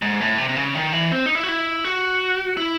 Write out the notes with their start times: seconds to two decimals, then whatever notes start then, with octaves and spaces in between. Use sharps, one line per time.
0.02 G#2
0.21 A2
0.38 C3
0.49 C3
0.56 C#3
0.75 D#3
0.93 E3
1.12 C4
1.26 D#4
1.35 E4
1.43 F#4
1.49 E4
1.85 F#4
2.57 E4